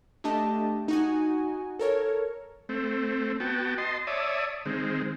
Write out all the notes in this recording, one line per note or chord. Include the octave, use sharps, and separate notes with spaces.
A3 D4 G4 D#5 A5
D#4 F#4 G#5
A4 A#4 C#5
A3 C4
B3 F#4 G5 A5
D#5 A5 C6
C#5 D5 E5 A5 D#6
D#3 G#3 C4